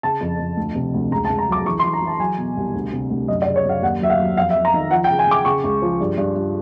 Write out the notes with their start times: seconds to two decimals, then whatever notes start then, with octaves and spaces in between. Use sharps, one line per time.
0.03 C#3 A5
0.21 F2
0.39 F2
0.57 D2
0.75 C3
0.94 D2
1.11 C#2 A#5
1.25 A5
1.30 C#2
1.38 A#5
1.48 F#3 D6
1.66 E3 C#6
1.79 C6
1.84 E3
1.93 A#5
2.02 E3
2.07 A5
2.20 F#3 G#5
2.38 B2
2.57 C2
2.74 D2
2.93 C3
3.11 D2
3.28 F#2 D#5
3.42 D5
3.47 C#3
3.56 C#5
3.65 F#2 F5
3.82 D#2 F#5
4.01 F#3 E5
4.10 F5
4.20 F#3
4.37 F2 F5
4.50 E5
4.55 F2
4.65 A#5
4.74 D#3
4.91 F3 F#5
5.04 G5
5.10 C#3
5.19 G#5
5.27 C#3 D6
5.45 C#3 C#6
5.64 C#2
5.82 F3
6.00 G2
6.18 G2
6.36 G2